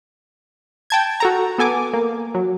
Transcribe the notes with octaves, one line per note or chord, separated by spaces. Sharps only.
G5 A5 G#6
F#4 A4 A#5
B3 A4 G#5 D6
A#3
F#3